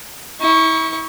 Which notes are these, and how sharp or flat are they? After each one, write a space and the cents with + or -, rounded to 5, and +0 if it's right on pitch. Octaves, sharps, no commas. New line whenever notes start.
E4 -35 C#6 +0